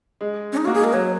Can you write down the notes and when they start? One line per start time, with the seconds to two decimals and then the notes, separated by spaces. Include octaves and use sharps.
0.21 G#3
0.52 C#4
0.57 D#4
0.65 A#3 F#4
0.74 G#4
0.80 G#3 A#4
0.93 F#3 C#5